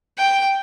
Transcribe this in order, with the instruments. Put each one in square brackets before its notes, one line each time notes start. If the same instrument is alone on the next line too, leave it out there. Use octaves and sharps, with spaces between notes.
[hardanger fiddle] G5